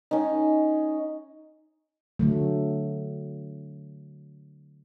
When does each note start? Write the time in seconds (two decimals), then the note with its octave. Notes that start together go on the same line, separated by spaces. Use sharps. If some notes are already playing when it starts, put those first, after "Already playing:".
0.11 C#4 D#4
2.19 D3 F#3 A3